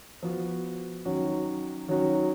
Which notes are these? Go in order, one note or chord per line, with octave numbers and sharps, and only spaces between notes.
F3 B3 F#4
D#3 F#3 C#4 F#4
D#3 F#3 C#4 F#4